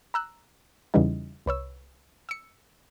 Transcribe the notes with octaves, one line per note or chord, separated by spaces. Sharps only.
A#5 E6 F#6
E2 C#3 E3 G3 D#4
C2 B4 C#5 E6
E6 C#7